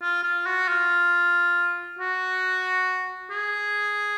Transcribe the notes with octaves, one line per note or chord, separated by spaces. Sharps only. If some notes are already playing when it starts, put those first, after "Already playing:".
F4
F4
F#4
F4
F#4
G#4